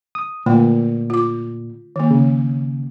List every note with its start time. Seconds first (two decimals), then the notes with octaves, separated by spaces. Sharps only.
0.15 D#6
0.46 A#2 D3 A3 G5
1.10 F4 D6
1.96 D#3 A#3
2.11 C#3